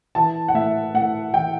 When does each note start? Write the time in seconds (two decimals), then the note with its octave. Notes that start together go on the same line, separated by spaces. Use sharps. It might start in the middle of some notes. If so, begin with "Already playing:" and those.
0.15 E3 A5
0.48 F#5
0.55 A2 E5
0.94 A2 F#5
1.33 E3 G5